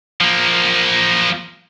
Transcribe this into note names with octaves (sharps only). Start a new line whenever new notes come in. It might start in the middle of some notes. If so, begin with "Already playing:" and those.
F3 A#3